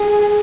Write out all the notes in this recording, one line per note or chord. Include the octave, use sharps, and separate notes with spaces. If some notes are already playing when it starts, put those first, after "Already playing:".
Already playing: G#4